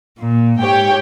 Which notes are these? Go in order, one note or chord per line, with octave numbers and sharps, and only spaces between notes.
A#2
G#2 G4 C#5 G5